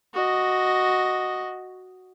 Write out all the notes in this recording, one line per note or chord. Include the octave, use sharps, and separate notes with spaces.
F#4 D#5